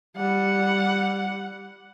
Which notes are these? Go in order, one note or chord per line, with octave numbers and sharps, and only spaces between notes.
G3 F#5